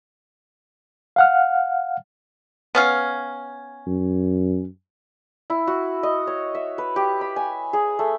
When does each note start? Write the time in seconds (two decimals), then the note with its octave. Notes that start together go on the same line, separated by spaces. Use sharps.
1.16 F5 F#5 F6
2.75 B3 C#4 F5
3.87 F#2
5.50 E4
5.67 F#4
6.03 D#5
6.27 C#5
6.55 E5
6.78 B4
6.96 G4
7.21 B5
7.36 G#5
7.73 G#4
7.99 A3